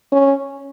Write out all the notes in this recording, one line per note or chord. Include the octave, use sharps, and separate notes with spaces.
C#4